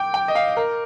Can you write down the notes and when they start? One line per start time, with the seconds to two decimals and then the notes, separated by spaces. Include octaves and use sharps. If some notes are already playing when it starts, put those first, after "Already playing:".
Already playing: G5 D6 G6 D7
0.14 G5
0.28 D#5
0.35 F5
0.57 A#4